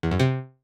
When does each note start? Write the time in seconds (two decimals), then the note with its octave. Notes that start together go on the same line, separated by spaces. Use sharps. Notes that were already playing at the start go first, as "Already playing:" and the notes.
0.03 E2
0.11 F#2
0.20 C3